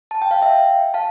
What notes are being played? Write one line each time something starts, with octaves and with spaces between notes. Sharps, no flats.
A5
G5
F5
E5 G5
F5 A5